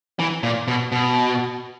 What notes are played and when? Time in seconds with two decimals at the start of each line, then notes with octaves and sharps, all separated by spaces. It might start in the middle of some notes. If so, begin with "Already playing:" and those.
0.19 E3
0.43 A#2
0.68 B2
0.92 B2